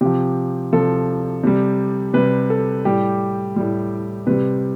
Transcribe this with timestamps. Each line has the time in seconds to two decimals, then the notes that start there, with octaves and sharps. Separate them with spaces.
0.01 C3 F3 G4
0.72 C3 F3 A4
1.44 C3 G3
2.14 C3 G3 B4
2.50 A4
2.85 A2 G3 G4
3.56 A2 G3
4.27 C3 G3 B4